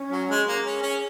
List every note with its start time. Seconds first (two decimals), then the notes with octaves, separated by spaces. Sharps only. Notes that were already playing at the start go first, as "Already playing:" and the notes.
Already playing: C#4
0.11 F#3
0.29 G#3
0.47 A#3 G#4
0.65 C#4
0.83 C#4